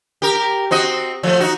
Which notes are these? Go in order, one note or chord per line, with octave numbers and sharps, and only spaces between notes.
G4 A#4
C4 F#4 D#5
F3 A3
D#4 F#4